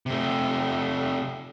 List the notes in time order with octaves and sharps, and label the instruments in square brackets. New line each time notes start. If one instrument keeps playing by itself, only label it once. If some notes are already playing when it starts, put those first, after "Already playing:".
[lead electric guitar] C3 A3